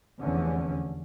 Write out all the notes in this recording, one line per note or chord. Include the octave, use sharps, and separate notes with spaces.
F1 E2 D3 C#4